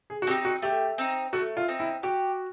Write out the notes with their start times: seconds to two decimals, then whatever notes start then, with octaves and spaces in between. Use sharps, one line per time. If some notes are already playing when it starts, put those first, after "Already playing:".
0.10 G#4
0.22 F#4
0.27 C4 G4
0.31 D#4
0.45 F#4
0.62 A3 G4
0.98 C4 D#4
1.33 A3 F#4
1.57 F4
1.68 C4 D#4
1.80 E4
2.03 F#4 G4